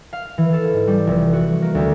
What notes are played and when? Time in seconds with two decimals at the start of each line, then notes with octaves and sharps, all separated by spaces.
0.13 F5
0.38 E3
0.53 A4
0.73 G#2
0.87 G3
1.07 F1
1.33 F#4
1.62 A#3
1.75 D2